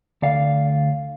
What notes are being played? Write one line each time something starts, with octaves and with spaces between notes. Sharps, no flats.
D2 D5 F5